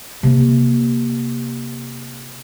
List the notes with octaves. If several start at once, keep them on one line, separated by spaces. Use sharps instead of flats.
C3 A#3